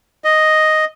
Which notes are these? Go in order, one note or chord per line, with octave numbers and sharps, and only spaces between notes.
D#5